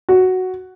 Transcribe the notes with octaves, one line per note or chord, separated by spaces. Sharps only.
F#4